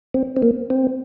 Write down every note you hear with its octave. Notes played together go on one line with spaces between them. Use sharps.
C4
C4
A#3
C4